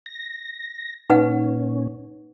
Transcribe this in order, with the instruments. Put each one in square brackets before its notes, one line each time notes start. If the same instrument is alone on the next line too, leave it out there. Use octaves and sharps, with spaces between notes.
[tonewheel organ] A#6
[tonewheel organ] A#2 C#4 [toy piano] D#4 B4 F#5